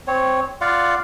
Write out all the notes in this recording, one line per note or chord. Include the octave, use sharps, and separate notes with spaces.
C4 C#5
F4 D5 F5 F#5